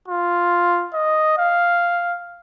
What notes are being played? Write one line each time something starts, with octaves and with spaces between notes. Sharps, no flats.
F4
D#5
F5